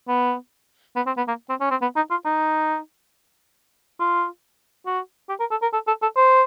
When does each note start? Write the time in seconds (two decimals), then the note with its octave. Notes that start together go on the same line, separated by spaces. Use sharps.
0.08 B3
0.96 B3
1.07 C4
1.17 B3
1.28 A#3
1.49 C4
1.61 C#4
1.71 C4
1.82 B3
1.96 D#4
2.11 F4
2.25 D#4
3.99 F4
4.86 F#4
5.29 G4
5.40 A#4
5.51 A4
5.62 A#4
5.73 A4
5.87 A4
6.02 A4
6.16 C5